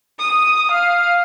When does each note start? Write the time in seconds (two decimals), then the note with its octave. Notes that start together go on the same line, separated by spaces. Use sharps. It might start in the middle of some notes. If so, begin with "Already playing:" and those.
0.19 D#6
0.71 F5